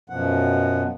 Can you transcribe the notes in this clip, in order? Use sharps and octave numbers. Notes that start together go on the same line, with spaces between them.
F#2 B2 F3 F#5